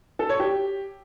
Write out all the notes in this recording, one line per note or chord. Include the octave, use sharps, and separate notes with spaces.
A4
C#5
G4